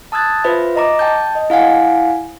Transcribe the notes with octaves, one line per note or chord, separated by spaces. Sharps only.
A5 D#6 E6 F#6 G#6 A6
F4 B4 C5 E5
D#5 A#5 D6
G5 A5 G6
D#5
E4 F5 F#5 G#5